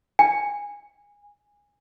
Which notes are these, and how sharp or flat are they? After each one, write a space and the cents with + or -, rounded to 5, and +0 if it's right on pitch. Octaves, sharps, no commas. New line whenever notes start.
G#5 -20